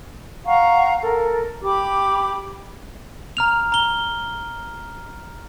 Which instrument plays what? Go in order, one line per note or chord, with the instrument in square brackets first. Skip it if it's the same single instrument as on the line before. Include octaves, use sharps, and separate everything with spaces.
[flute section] F5 F#5 A#5 C#6
A4 A#4
G4 B5 D6
[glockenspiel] A#5 F6 F7
A#5 G7